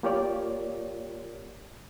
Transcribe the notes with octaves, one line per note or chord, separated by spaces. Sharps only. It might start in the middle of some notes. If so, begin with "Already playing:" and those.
A#3 F4 G4 A#4 C#5 D5